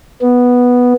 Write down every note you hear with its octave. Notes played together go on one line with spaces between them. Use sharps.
B3